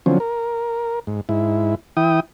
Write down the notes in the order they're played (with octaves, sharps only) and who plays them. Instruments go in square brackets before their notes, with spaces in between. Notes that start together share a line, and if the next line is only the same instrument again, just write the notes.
[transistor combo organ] D3 F3 F#3 C4 C#4
A#4
G#2
G#2 E4
E3 E4 G5 D#6